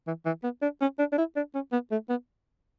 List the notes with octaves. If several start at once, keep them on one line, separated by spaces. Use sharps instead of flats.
E3
E3
B3
D4
C#4
D4
D4
E4
D4
C#4
B3
A3
B3